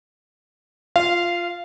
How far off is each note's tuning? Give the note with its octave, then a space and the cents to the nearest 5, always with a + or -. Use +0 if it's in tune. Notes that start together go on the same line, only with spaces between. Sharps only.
F4 +0 F5 -15